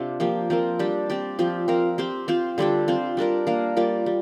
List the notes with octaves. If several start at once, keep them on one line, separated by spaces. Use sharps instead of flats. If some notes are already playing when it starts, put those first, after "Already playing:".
Already playing: C3 C4 D4 F4 C5
F3 A#3 G4
F3 C4 F4 A#4
G3 D4 G4
C4 G4 D5
F3 C4 G4
C4 A#4 F5
C4 G4 C5
C4 F4 C5
D3 G3 D4 G4
C4 F4 C5
G3 D4 A#4 D5
A#3 D4 A#4 F5
G3 A#3 F4 D5
G3